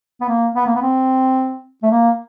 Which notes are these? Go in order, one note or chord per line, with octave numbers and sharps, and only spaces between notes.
B3
A#3
B3
A#3
B3
C4
A3
A#3